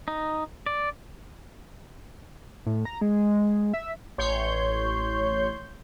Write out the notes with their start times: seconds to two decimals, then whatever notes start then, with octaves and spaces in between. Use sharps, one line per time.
0.08 D#4
0.66 D5
2.66 A2
2.85 A#5
3.01 G#3
3.74 E5
4.18 A1 C#5 C6 G6